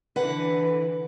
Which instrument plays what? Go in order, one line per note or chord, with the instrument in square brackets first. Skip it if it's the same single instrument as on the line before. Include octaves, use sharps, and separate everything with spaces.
[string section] D3 E3 [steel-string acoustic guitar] B4 F#5